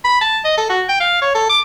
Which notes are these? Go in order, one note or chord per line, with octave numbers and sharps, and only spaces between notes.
B5
A5
D#5
A4
F#4
G5
F5
C#5
A4
D6